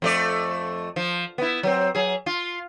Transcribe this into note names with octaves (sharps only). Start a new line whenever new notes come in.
F2 A3 D5
F3
B3 E4
F#3 C4
F#3 G#4
F4